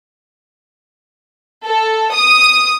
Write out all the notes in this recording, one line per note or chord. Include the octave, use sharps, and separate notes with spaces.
A4
D#6